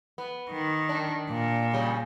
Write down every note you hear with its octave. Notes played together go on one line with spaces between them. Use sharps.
B3
D#3
D4
A#2
C#3 G3